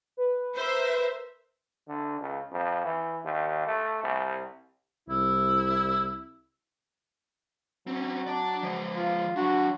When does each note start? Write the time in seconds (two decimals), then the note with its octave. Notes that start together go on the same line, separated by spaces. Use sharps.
0.17 B4
0.56 A#4 C5 E5
1.88 D3
2.21 C#2
2.52 F2
2.85 E3
3.24 D#2
3.67 A3
4.03 C2
5.09 C2 E4
7.87 F#3 C4 C#4
8.27 D5 A5
8.63 F3 G#3
8.96 F4
9.36 F#3 D4 F#4